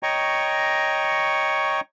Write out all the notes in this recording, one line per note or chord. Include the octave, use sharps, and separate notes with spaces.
C#5 D#5 G5 A#5 C#6